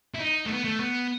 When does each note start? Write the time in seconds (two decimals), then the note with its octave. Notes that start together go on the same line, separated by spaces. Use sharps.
0.14 E4
0.20 D#4
0.46 A3
0.50 B3
0.64 A3
0.79 B3